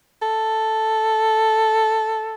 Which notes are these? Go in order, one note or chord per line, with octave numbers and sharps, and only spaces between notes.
A4